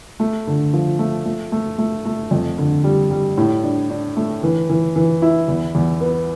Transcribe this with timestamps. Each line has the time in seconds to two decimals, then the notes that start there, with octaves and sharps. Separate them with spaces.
0.20 A3
0.47 D3
0.73 F3
0.99 A3
1.26 A3
1.52 A3
1.78 A3
2.05 A3
2.31 F2
2.58 D3
2.84 G3
3.11 G3
3.38 A2
3.64 D4
3.90 D4
4.17 A3
4.43 E3
4.69 E3
4.96 E3
5.22 E4
5.48 E2
5.75 E2
6.01 B3